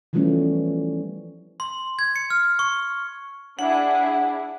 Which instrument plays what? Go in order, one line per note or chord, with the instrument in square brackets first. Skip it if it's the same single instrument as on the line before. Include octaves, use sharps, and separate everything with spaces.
[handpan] E3 F3 G3 A3 B3 C#4
[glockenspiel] C6
G#6
C#7
F6
C#6
[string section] D4 E4 G#4 [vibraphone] F#5